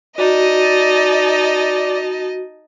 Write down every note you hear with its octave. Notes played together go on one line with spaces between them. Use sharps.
D#4 F#4 D5 D#5 A5